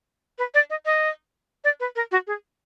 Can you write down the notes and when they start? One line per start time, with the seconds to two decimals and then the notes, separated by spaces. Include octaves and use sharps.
0.38 B4
0.54 D5
0.70 D#5
0.86 D#5
1.64 D5
1.80 B4
1.96 A#4
2.12 F#4
2.27 G#4